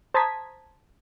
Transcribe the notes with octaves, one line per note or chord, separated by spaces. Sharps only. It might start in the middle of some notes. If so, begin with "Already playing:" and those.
C5 A5 A#5 D#6 G#6 B6